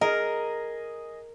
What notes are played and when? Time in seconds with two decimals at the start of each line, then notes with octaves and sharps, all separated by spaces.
0.01 G#4 A#4 D#5